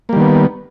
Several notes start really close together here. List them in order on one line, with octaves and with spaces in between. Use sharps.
A#3 G3 D#3 B3